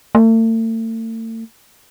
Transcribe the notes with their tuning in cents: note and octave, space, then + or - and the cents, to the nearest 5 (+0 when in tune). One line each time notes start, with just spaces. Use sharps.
A3 +40